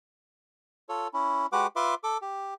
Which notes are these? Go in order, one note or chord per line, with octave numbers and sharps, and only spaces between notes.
F4 A4 C#5
C#4 E4
G#3 F#4 G4 B4 F#5 D6
F4 B4 E5 C6 D6
A4 D6
G4